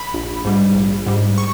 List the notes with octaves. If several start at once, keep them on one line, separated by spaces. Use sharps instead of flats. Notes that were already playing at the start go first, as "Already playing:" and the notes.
Already playing: B5
A#1
G#2 G3
A#1
G#2 G3
C#6